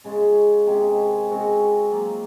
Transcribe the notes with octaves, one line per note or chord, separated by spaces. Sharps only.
C#3 G#3 C#4 F4
C3 D#3 G#3 C#4
C#3 G#3 C4 F#4
F#3 A#3 F4